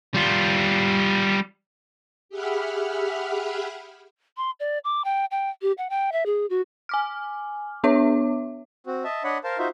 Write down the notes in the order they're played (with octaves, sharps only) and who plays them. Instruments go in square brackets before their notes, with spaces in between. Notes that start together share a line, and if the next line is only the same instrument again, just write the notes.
[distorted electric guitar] G3 F4
[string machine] G4 G#4 E5 F#5 B5 F6
[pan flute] C6
D5
D6
G5
G5
G4
F#5
G5
E5
G#4
F#4
[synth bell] G#5 D6 F6
B3 D4 C#5 E5 D6
[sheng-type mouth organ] C4 F#4
D#5 E5 A5
D4 C#5 D#5 F#5 B5
A#4 C5 F5 A5
D#4 F4 F#4 C5 E5